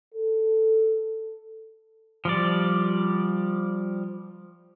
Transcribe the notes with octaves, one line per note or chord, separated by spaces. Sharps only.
A4
F3 G3 D5